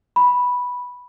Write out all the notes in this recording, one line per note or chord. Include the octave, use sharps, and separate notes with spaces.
B5